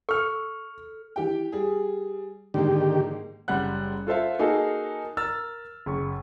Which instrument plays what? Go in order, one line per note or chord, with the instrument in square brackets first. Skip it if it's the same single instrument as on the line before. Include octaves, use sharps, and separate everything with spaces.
[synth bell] A4 [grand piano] C#6 F6
[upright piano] E3 G4 G5
G3 G#4
[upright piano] G#2 G#3 A#3 [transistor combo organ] D3 D#3 G4
[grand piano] F#1 G3 F#5 F#6
F4 A4 C5 E5 F5
A#3 D#4 F#4 G#4 A4
A#4 E6 F6 A6
F#1 C#6